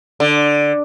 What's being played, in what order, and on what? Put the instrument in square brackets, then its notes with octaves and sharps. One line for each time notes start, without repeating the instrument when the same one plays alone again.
[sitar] D3